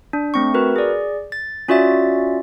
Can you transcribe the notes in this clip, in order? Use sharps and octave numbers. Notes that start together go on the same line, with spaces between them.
D4
A3 C4 C#6
F#4 A#4 B4
G#4 D5
A6
C#4 F4 F#4 D5 E5 A6